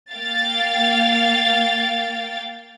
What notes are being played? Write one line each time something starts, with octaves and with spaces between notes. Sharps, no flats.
A#3 F5 G5 A6